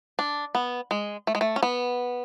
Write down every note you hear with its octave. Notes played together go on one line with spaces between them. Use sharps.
D4
B3
G#3
A3
G#3
A3
C#4
B3